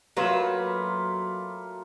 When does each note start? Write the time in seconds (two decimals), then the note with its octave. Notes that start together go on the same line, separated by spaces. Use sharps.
0.17 F#3 A3 A#3 F4 B4